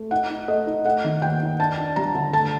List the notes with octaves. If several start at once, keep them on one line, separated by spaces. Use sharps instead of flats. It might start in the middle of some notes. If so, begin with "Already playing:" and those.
Already playing: A3
D#4 F#5
D#4
A3 D#5
D#4
A3 F#5
D#3
D#2 G5
D#4
D4 A5
D4
G3 A#5
D3
A3 A5